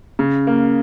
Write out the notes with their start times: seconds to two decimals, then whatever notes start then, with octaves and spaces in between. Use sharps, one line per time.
0.19 C#3
0.47 A#3